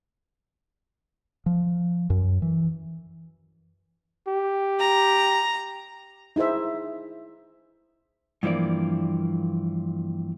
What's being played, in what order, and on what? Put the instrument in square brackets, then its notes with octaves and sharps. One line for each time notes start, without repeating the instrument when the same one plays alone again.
[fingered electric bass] F3
F#2
E3
[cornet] G4
[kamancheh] A#5
[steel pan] D#4 E4 G#4 C5 E5
[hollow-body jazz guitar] G2 E3 F3 A#3 D5